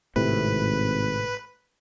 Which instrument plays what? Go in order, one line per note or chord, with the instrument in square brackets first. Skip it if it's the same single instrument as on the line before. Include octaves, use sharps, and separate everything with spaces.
[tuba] G#1 [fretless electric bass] A2 C3 [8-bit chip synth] B4